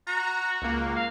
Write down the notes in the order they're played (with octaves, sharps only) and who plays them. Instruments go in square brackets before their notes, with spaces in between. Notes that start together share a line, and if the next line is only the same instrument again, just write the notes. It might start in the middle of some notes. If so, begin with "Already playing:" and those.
[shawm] F#4 [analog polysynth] A#5
[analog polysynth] C#2 A#3
[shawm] F5